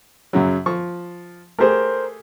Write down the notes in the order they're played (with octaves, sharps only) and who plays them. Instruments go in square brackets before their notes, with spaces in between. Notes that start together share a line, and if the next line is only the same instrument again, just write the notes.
[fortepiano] F#2 C#3 F#3
F3 C#6
[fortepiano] A3 G4 G#4 [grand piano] A#4 C5